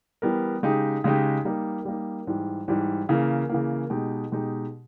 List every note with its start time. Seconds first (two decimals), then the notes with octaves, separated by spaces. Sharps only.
0.22 E3 G3 B3 G4 A#4
0.63 C#3 G#3 D#4 G4
1.04 C#3 G#3 D#4 G4
1.45 G3 A#3 D#4
1.85 G3 A#3 D#4
2.27 G#2 E3 G3
2.68 G#2 E3 G3
3.09 C#3 E3 A#3
3.49 C#3 E3 A#3
3.90 B2 G#3 D#4 G4
4.32 B2 G#3 D#4 G4